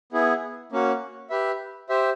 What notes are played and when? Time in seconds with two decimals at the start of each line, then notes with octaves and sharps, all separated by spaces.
0.12 B3 E4 G#4
0.72 A#3 C#4 F#4
1.30 G4 B4 E5
1.89 G4 C5 E5